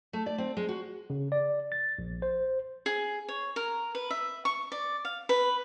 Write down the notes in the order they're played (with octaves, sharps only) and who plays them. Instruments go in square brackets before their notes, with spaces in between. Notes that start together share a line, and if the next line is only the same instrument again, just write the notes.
[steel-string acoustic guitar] A3
D5
C4
G#3
F#4
[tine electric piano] C#3
D5
A6
A#1
C5
[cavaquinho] G#4
C#5
A#4
B4
E5
C#6
D5
F5
B4